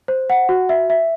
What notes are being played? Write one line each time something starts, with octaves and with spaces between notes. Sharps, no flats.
C5
F#5
F#4
E5
E5